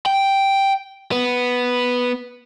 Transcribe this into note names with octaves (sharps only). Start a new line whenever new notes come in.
G5
B3